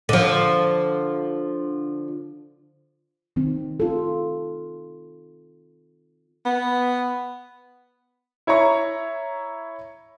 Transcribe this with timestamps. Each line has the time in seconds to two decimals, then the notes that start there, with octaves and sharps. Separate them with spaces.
0.09 D3 F3
3.36 D#3 C4 D#4
3.80 F4 A4
6.46 B3
8.47 E4 C#5 E5 A#5 C#6